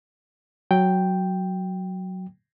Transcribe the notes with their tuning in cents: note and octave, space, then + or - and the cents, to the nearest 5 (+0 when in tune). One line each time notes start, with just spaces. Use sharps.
F#3 +0 G5 +0